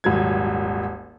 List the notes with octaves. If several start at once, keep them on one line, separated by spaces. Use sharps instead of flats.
D#1 G#1 F#3 G#6